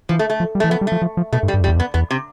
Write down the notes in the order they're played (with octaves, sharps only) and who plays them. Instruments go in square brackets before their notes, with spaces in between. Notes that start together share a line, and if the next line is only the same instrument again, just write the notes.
[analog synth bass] E3 [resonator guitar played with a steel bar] F3
[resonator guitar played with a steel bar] A3
A3
[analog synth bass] F3
G3
[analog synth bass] E3 [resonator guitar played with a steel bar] A3
[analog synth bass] F3 [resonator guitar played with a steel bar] B3
[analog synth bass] G3
[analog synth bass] F3 [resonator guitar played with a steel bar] A3
[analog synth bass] F3
F3
[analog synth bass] B2 [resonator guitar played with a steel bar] A3
[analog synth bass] G2
[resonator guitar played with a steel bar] G3
[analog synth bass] G2
F2
[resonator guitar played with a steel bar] G3
[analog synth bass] E2
F2
[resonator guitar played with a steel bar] B3
[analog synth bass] E2 [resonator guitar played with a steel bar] B3
[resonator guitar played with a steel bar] C3